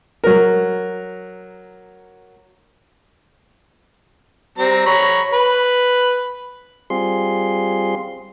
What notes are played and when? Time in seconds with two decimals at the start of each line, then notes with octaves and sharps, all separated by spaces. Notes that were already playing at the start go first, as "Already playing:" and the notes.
0.24 F#3 A#4
4.58 G3 C4 A#5
4.86 C#5 A#5 B5
5.33 B4
6.90 G3 C4 F4 G#4 C6